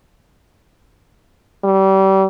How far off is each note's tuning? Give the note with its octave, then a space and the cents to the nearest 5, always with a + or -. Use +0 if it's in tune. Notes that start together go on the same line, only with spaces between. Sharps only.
G3 -30